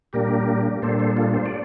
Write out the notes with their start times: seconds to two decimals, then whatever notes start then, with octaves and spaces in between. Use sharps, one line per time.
0.13 A#2 G3 A#3 D4 G4 A#4
0.82 A#2 G3 A#3 D4 A4 C5
0.99 A4 C5
1.17 F4 A4
1.34 C5
1.46 D5